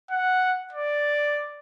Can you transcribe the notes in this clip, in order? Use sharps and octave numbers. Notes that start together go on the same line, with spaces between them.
F#5
D5